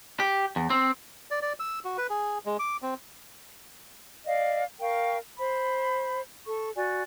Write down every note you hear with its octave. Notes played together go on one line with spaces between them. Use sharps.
G4
E2
C4
D5
D5
E6
F#4
B4
G#4
G#3
D6
C4
D5 D#5 F5
A#4 F5 G5 C#6
C5 B5
A4 C#6
F#4 D5 G#5